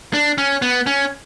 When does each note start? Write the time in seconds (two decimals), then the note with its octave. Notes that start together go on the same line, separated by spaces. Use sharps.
0.14 D4
0.38 C#4
0.62 B3
0.86 C#4